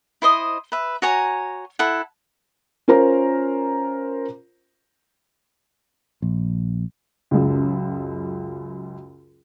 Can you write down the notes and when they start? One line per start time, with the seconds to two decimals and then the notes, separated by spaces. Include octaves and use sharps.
0.22 E4 C5 D#5 D#6
0.72 B4 E5
1.02 F#4 C#5 G#5 A#5
1.79 E4 A4 F#5
2.88 C#4 F4 A#4 C5 A#5
6.22 A#1
7.31 C#2 F#2